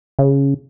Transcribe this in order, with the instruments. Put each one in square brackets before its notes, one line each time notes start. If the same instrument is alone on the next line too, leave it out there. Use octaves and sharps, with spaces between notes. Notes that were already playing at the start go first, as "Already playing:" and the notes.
[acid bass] C#3